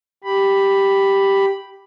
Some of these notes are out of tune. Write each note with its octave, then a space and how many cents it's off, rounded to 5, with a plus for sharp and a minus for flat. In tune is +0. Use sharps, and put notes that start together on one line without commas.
G4 +0 B5 +0